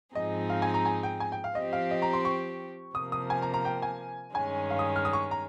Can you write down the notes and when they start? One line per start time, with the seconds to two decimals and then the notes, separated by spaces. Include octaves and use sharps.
0.15 G#2 F3 C4 D#4 G#4 D#5
0.50 F5
0.62 G#5
0.74 A#5
0.85 G#5
1.03 G5
1.20 G#5
1.32 G5
1.44 F5
1.55 F3 C4 G4 D#5
1.73 F5
1.91 D#5
2.02 A#5
2.13 C6
2.25 C#6
2.95 C3 F3 A#3 D#6
3.12 D#6
3.30 G#5
3.42 A#5
3.54 A#5
3.65 G5
3.82 G#5
4.35 G2 D#3 G#3 C#4 G#5
4.70 F5
4.79 D#6
4.96 F6
5.05 D#6
5.13 C#6
5.31 A#5